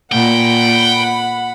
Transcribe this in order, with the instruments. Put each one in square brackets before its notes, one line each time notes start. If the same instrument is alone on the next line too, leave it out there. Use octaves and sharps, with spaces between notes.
[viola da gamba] A#2 [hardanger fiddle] F#5 B5 [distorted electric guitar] G5